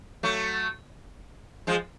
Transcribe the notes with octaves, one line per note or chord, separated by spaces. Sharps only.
F#3 A3
F3 G#3